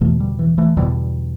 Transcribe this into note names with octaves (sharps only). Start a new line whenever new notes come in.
E2 B2 E3 A3
D3 G3
E3
E3 A3
E2 B2 D3 G3